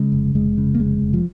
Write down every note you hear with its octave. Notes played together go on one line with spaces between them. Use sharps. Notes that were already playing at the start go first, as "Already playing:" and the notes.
Already playing: C#3 G#3
F1
F1 G#3
C#3
A#3
F1 G#3
F1
F3